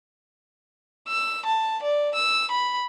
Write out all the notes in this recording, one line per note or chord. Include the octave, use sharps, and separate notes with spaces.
E6
A5
D5
E6
B5